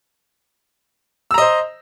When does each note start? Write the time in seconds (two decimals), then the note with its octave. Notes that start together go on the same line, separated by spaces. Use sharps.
1.31 E6
1.34 A#5
1.38 D#5
1.41 C5